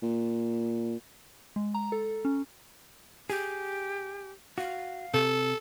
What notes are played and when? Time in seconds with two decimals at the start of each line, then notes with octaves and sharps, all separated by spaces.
0.03 A#2
1.56 G#3
1.74 A#5
1.92 A4
2.25 C#4
3.30 G4 G#4
4.58 F#4 F5
5.14 C3 A4